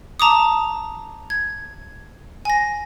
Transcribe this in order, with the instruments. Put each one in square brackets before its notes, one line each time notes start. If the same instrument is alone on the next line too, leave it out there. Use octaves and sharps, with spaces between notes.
[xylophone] A5 A#5 D6 D#6
G#6
G#5 A#6